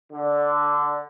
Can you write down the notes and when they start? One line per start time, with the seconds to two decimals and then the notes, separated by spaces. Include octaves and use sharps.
0.12 D3